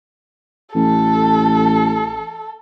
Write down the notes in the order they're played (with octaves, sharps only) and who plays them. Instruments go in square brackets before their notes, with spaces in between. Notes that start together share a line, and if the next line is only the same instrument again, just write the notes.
[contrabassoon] A1 [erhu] A4